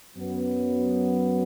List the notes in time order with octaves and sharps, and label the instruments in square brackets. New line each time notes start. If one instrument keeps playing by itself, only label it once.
[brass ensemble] F#2 F#3 B3